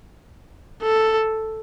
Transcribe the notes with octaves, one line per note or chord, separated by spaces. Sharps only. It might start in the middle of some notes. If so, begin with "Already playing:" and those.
A4